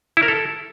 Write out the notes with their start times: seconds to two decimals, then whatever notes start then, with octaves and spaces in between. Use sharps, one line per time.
0.17 E4
0.23 A#4
0.28 A4